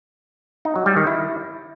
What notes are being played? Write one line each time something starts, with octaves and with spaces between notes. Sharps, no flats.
D#4
F#3
G3
D#3
E4